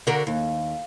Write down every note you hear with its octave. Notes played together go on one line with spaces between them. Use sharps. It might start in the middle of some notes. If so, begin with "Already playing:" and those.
D3 F#4 A#4
D#2